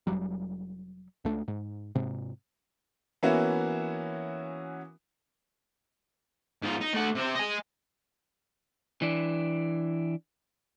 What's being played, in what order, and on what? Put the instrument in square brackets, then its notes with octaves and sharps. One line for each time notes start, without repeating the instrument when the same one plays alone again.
[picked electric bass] F1 B1 F#3 G3
C#2 A3 D4
G#2
G#2 C3
[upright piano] E3 A#3 B3 C#4 E4 F#4
[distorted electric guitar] G#2 F4
D#4
A3 F#5
C3 C5
D#5 G#5
[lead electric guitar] E3 D4